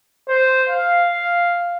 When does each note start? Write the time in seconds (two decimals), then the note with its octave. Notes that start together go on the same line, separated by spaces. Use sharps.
0.28 C5
0.69 F5